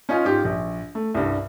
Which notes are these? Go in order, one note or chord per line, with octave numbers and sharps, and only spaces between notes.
C#4 D#4 F4 G#5
G#2 F4 G4
A#1
A3
C2 G2